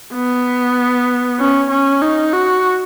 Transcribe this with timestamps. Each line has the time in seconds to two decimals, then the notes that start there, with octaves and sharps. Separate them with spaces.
0.14 B3
1.40 C#4
1.71 C#4
2.02 D#4
2.33 F#4